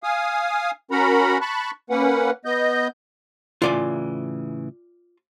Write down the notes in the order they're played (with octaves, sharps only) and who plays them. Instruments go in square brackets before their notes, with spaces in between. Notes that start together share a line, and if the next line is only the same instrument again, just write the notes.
[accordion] F5 G#5 D#6
C#4 F#4 A#4 F#5 A#5 B5
A5 B5 C#6 F#6
A#3 C#4 B4 F#5
B3 D#5 G6
[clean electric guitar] A2 C#3 E3 [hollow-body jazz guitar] F4 D5 G#5